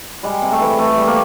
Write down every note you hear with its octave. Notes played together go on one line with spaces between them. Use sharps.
G3 G#3
C3
A3
E3
C3 A3
G3
A#3